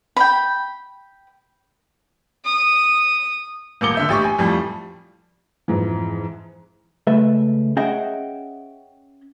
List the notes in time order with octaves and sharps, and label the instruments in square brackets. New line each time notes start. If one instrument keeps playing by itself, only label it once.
[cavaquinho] G5 B5
[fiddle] D#6
[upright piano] D#1 A#3 D6 C#7 G7
D3 E5 G6
A1 G4 C#6
G#5
F2 A2 F3 G3
[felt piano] F2 G#2 E3
[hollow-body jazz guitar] C#2 A3 A4 B4 E5
C#4 G#4 D#5 E5 F#5 G5